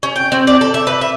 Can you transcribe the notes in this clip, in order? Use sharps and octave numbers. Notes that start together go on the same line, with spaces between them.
C#4
G5
C4
D5
A4
E5
B4
E5